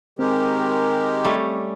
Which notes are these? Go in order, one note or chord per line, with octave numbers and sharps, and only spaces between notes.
D#3 G#3 C4 G4 A#4
G3 A3 C#4